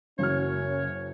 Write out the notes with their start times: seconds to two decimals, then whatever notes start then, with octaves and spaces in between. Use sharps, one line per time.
0.19 F#1 F#2 C#3 C#4 F#4 C#5 F6